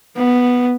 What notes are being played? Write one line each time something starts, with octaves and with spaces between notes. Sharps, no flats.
B3